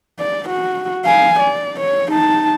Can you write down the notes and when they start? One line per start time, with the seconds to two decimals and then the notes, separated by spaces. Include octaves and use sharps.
0.19 D5
0.49 F#4
1.05 F5 G#5
1.40 D5
1.80 C#5
2.12 D#4 A5